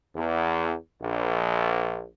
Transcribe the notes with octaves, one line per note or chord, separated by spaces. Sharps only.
E2
A#1